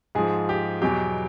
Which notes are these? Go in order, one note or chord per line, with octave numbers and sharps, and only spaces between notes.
G#2 F3 G#4
G4
E2 B2 F#3 G4